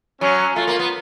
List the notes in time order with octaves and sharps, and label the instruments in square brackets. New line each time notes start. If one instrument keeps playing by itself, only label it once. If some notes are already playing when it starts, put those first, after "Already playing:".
[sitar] F#3 [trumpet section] C#4
[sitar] A3 [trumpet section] F4
[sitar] A#3
B3